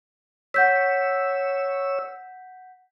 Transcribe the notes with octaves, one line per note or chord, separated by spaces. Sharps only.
C#5 F#5 E6 G6 B6